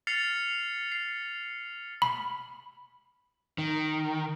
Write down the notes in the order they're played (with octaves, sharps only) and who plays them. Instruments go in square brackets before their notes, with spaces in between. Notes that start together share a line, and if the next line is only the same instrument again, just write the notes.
[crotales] F6 A6 C7 C#7 F7
C7
[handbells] B5
[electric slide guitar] D#3